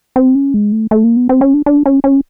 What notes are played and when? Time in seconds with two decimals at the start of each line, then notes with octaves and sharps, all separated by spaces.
0.16 C4
0.35 C#4
0.54 G#3
0.72 A3
0.91 A3
1.04 A#3
1.17 B3
1.29 C4
1.41 C#4
1.54 D4
1.66 D4
1.86 C#4
2.04 C#4